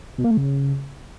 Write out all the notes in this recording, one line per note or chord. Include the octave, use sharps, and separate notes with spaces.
B2
A#3
A3
C#3